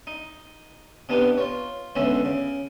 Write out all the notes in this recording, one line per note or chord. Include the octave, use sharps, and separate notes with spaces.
D#4
C3 B3 D4 D#4 G4 B4
F4 C#5
C#2 B2 D3 F#3 C#4 E5
C#3